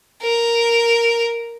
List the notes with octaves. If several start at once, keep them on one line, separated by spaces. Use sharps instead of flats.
A#4